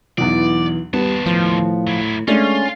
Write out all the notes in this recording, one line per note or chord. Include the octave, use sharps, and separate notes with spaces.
B1 E2 E3 D5
D#2 G3 B3 A5
A2 F3
F#3 E4
G#3 A3 C#4 D4 F4